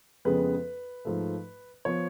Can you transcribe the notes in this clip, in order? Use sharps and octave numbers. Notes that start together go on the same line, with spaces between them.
F2 C#3 G#3 B3 B4
G#2 F3 A3
F3 B3 C#5